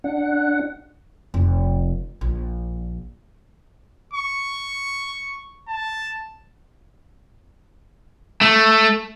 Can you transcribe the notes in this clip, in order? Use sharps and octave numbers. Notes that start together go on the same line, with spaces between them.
D4 F#5
F1
A#1
C#6
A5
A3